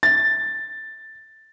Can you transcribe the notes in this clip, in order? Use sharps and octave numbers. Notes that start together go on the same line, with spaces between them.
A6